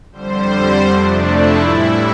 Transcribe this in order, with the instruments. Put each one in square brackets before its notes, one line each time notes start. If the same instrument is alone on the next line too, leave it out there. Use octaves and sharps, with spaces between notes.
[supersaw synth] F2 D3 G3 C5
F2 C3 F3 A3 D4
E4
A2 E3 G3